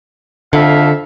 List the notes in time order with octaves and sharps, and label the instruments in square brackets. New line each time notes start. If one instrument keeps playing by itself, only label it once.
[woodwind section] F2 E5 F5 [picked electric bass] D3